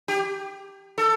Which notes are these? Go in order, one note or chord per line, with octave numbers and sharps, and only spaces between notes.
G4
A4